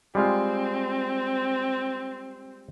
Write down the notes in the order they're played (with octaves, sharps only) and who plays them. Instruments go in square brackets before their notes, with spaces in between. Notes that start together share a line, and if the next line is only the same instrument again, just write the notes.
[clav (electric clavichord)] G3 G#3 F4 [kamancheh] C4